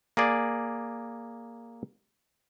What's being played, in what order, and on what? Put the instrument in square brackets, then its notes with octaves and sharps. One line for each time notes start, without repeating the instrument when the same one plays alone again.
[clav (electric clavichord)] A#3 G#4 D5